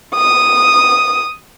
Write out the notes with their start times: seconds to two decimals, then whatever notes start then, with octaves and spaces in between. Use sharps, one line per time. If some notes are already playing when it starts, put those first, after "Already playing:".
0.15 D#6